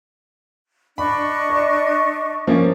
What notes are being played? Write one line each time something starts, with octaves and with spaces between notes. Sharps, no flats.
D4 D#5 B5 C#6
D5
F3 A#3 C#4